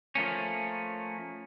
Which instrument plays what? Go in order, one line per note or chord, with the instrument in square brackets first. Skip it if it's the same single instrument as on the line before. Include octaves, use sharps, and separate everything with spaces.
[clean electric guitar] F3 A3 A#3 C#4